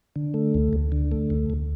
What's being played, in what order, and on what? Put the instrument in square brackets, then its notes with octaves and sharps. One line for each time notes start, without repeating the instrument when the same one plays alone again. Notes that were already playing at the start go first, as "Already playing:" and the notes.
[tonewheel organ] D3
A3
D2
D2
D3
A3
D2
D2